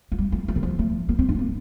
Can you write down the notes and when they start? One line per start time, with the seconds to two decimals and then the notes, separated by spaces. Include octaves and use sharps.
0.12 F3
0.18 G3
0.32 A3
0.48 A3
0.56 D#3
0.63 F3
0.79 A3
1.09 A#3
1.19 C4
1.29 D4
1.35 A3
1.39 A#3